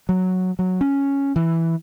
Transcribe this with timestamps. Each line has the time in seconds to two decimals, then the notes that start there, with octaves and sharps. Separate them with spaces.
0.09 F#3
0.59 F#3
0.81 C#4
1.36 E3